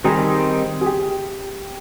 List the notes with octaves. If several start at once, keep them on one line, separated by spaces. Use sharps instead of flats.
D#3 G3 C4 D#4 G#4
G#4
G4